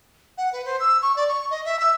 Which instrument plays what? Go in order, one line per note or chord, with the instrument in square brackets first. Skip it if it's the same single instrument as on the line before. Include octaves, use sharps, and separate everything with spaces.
[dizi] F#5
B4
C5
E6
C#6
D5
C#6
D#5
E5
E6